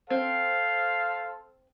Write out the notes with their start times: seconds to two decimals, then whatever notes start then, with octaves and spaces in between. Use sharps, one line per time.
0.10 C4 A4 C5 F5